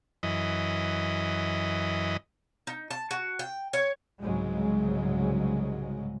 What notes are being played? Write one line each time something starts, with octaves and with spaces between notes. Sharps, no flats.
F#2 E3 D#5
D#4
A5
F#4
G5
C#5
C2 G#2 C#3 F#3 G#3